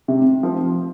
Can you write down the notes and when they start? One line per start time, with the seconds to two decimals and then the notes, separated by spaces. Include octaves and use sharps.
0.08 C3
0.43 F3 C4